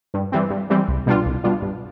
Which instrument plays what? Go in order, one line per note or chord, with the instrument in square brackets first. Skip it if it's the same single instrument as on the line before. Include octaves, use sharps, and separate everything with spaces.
[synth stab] G2
E3 G3 C4
G2
E3 G3 C4
C2
B2 G3 D4 F4
C2
B2 G3 D4 F4
G2